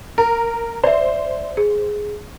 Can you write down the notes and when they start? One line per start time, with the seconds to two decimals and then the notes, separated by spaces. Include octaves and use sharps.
0.18 A#4
0.84 C5 D5 E5
1.57 G#4